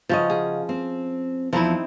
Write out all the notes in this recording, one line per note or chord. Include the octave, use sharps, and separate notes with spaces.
C#3 F3 C#4 F#4 D#5
G#4
C4
E2 F3 C4 D#4 E4